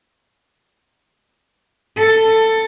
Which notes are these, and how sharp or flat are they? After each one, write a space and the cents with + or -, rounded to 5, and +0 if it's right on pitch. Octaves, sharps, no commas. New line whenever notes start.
A4 +15